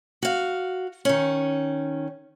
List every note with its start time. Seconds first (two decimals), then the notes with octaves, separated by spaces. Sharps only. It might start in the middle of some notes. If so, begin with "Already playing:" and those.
0.22 F#4 F5
1.05 D#3 C#4